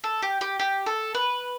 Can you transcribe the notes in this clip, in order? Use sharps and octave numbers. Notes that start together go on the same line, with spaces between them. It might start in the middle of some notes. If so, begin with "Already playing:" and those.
A4
G4
G4
G4
A4
B4